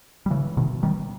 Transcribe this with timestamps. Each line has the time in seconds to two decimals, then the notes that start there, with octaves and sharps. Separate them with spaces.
0.26 G3
0.31 C#3 E3
0.57 B2 D#3
0.83 D#3 G3